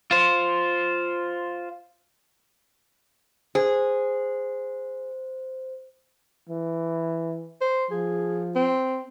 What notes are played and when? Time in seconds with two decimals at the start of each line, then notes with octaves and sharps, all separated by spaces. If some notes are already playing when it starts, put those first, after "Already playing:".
0.11 F4 C5
3.55 G#4 C5
6.49 E3
7.61 C5
7.91 F3 G#4
8.55 C4